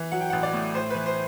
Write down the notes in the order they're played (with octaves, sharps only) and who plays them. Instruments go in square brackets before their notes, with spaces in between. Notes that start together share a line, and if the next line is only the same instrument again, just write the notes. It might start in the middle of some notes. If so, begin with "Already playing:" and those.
Already playing: [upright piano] E3
F#3 F#5
G5
A1 F#5
D5
A2
A2 C5
E3 B4
C5